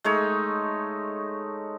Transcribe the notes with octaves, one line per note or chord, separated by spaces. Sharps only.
G#3 A3 D#4 C#5